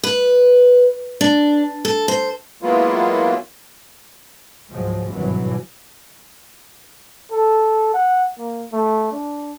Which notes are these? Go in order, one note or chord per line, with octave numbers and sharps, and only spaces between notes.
B4
D4
A4
C5
F#3 G#3 A#3 B3 E4 F4
C#2 G#2 F3 F#3 G#3
G#1 G2 B2 E3 F#3
A4
F#5
A#3
A3
D4